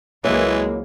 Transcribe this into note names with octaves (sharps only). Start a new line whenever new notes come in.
C#2 E3 F#3 G#3 A#3 E4 B4 C#5